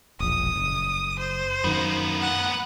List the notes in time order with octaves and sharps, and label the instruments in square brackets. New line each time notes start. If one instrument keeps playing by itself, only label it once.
[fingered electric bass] E1 A#1 [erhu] D#6
[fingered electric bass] F#1
[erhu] C5
[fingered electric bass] F#2 D#3 [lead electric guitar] A#3 B3
[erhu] F#5